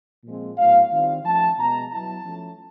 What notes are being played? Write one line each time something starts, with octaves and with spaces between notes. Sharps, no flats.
A#2 F3 G#3 C4
A2 F#3 B3 F5
D#3 G3 C4 F4 F5
F3 A3 C#4 A5
B2 G#3 B3 A#5
F#3 B3 E4 A5
F3 A3 C#4